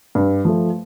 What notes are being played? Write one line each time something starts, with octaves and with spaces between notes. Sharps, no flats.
G2
F3 A3